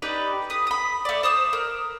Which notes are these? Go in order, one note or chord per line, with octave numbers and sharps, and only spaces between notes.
D#4 G4 B4 D5
B4 D#6
B5 D#6
A3 D5
C5 D#6 E6
A#4